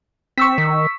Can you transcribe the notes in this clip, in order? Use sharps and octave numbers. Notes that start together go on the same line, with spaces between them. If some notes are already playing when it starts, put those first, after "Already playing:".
C4 C#6 E6 B6
D#3